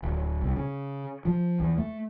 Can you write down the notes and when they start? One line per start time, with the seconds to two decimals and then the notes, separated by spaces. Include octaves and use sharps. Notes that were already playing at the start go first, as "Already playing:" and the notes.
0.03 D1
0.41 C2
0.56 C#3
1.25 F3
1.60 E2
1.78 A3